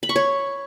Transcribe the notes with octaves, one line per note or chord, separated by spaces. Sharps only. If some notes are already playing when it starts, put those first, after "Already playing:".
B5
C#6
C#5